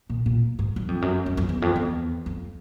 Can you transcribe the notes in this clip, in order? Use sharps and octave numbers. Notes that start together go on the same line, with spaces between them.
A#2
A#2
G#2
F#2
F2
F#2
F#2
F2
E2
F2
E2
F2